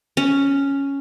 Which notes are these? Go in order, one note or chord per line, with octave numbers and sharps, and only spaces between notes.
C#4